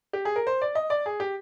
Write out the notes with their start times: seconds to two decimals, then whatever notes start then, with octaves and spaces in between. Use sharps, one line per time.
0.13 G4
0.25 G#4
0.36 A#4
0.47 C5
0.62 D5
0.75 D#5
0.90 D5
1.06 G#4
1.20 G4